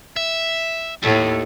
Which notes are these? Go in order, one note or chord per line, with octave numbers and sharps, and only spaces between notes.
E5
D#2 A2 A3